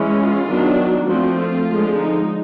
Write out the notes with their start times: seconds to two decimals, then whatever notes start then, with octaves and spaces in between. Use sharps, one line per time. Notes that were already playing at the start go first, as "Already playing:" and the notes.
Already playing: E3 G#3 C#4
0.18 F4
0.47 D#3 F#3 B3 D4
0.77 F#4
1.07 F3 A3 C4
1.38 F4
1.67 D3 F3 G#3
1.96 D#4